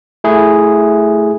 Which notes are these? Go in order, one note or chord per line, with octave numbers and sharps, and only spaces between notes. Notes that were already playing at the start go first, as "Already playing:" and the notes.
A3 E4 G#4